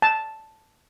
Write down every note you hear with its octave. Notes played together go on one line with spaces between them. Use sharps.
A5